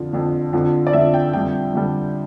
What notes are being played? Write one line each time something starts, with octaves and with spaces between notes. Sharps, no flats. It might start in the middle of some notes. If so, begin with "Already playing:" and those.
Already playing: F2 D3 F3
F2 D3 F3
F2 D3 F3
D5
F2 D3 F3 E5
G5
F2 D3 G3 G5
F2 D3 G3